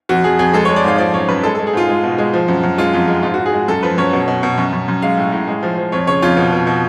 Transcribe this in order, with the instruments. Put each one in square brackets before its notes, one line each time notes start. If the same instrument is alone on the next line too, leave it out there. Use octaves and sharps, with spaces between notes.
[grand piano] F2 F#4
F2 G#4
F2 G#4
G#3 A4
C#5
G#3
D5
G#2 F5
F3 D5
F#2 C#5
F#2 B4
G#3 A4
A4
G#3
G#4
G#2 F4
G#3
B2
G#3
F3
F#2
F#2
G#3 F4
F2
G#3
G#2 F4
F#4
G#2
G#4
G#3
F#2 A4
F3 B4
F#2 C#5
B2
B2
B2
F#2
F#2
F#2
G#3 F5
A2
A2
G#3
F3
F3
F2 C#5
C#3 C#5
F2 F4
B2
B2
B2